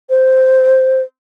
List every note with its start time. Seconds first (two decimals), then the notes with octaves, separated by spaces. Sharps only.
0.10 C5